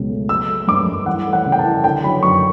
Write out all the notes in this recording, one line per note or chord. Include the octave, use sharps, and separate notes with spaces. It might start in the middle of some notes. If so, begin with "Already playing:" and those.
Already playing: C#2 B2 F#3
A3
F#3 E6
A3
G2 D6
G2
E3 F#5
A3
F#5
C#3
G5
A5
E4
D3 G5
F#3 B5
F#2 C#6